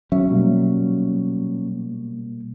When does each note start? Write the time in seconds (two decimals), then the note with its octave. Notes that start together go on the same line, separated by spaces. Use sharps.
0.12 F#3 C#4 E5
0.30 B2 G3 A#3